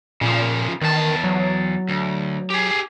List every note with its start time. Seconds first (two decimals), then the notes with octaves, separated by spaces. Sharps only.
0.21 A#2 C#3 F3
0.82 E2 D#3 A5
1.24 F#3
1.89 D2
2.50 G4 G#4